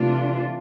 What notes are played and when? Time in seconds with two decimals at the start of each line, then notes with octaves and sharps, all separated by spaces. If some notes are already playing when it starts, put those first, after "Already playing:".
Already playing: C3 E3 A3 D4 F4